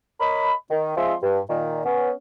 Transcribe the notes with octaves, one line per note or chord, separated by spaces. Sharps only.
A#4 C#5 D#5 B5
D#3
F3 G#3 C4 G#4 E5 C6
G2
A#2 D#3
B3 C#4